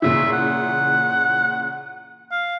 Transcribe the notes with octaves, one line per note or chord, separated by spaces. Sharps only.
A#2 C#3 E3 E5
F#5
F5